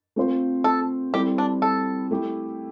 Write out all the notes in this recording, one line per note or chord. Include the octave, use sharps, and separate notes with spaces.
A3 C4 F4 A4 C5
A4
G3 C4 E4 G4 A4
D4
A4
A3 E4 G4